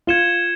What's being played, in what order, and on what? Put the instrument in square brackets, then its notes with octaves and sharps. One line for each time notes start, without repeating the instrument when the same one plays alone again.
[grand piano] F4 [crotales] G#6 C#7 E7 G7